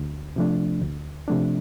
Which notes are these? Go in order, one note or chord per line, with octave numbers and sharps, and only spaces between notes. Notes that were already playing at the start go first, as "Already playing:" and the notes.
Already playing: D2
C3 F3 A3 D4
D2
C3 F3 A3 D4